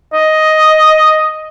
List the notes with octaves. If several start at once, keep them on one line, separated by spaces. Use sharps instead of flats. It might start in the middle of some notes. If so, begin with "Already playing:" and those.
D#5